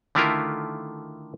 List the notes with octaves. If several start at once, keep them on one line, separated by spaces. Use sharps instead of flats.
D3 D#3 A3 E4 F4 A#4